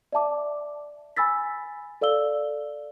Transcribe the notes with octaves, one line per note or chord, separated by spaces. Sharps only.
D5 E5 A5 D6
G#5 B5 E6 A6 B6
A4 D5 F5 E6 G7